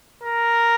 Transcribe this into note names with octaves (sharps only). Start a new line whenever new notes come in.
A#4